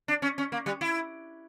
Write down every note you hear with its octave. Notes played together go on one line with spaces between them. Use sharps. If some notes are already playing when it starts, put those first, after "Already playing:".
D4
C#4
C#4
A#3
G3
E4